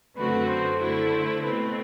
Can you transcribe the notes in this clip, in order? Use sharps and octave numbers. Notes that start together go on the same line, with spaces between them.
F#2 D3 A3 C4 F#4 B4
C5
D3 A3 E4 C5
C5
B2 A3 C4 B4